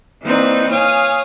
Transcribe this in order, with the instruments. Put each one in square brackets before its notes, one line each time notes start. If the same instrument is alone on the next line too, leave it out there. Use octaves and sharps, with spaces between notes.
[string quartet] E3 A#3 C4 D#4 B4 D5
C#5 F5 G#5 D#6